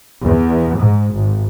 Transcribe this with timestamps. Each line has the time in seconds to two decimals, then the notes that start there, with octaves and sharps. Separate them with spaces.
0.24 E2
0.79 G#2
1.15 G#1